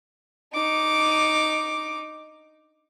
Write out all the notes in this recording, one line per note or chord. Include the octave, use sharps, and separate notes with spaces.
D#4 D6